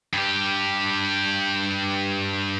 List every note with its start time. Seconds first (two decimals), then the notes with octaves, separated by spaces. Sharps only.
0.14 G2 G4